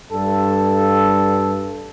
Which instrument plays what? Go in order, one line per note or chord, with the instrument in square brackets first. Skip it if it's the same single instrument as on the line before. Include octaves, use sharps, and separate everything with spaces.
[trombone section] G2 A4